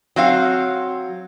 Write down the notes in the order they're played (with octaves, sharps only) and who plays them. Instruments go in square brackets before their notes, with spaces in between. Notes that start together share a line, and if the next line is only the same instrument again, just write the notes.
[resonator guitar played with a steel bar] F#3 C4 F5